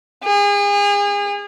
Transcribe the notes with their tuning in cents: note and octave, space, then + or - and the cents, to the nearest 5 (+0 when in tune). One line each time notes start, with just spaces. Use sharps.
G#4 -35